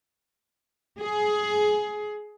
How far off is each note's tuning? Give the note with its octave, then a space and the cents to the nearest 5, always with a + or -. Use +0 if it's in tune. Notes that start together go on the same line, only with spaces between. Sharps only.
G#4 +15